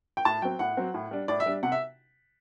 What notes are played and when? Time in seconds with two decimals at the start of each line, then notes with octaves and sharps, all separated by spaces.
0.17 G5
0.25 A2 A5
0.42 F#3 C4 G5
0.59 A2 F#5
0.77 F#3 C4
0.94 A2
1.11 G3 D4
1.28 A2 D5
1.40 E5
1.46 G3 D4
1.63 C3 F#5
1.72 E5